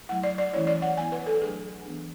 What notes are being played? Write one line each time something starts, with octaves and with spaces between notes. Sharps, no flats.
F#3 A3 E4 F#5
D5
D5
E3 A3 C#4 E4 C#5
D5
F#5
E3 B3 E4 G#5
B4
A4
F#3 A3 D4 G#4
E3 B3 D4